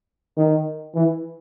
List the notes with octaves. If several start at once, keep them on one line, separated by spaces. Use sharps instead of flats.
D#3
E3